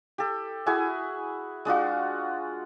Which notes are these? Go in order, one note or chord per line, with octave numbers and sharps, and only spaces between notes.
G4 A4
E4 F#4 G#4 G#5
G#3 D4 F4 F#4